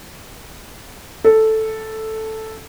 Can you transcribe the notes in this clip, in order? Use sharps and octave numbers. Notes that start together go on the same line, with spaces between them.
A4